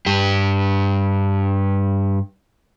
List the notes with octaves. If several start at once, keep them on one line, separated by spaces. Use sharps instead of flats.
G2 G4